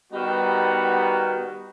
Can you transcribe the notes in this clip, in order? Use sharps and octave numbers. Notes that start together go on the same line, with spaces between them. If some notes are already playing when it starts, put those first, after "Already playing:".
D#3 G3 B3 D#4 F#4